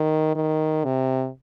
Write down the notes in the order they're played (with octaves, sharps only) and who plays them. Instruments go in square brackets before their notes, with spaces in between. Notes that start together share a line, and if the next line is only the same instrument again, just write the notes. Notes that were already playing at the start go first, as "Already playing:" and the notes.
Already playing: [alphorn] D#3
D#3
C3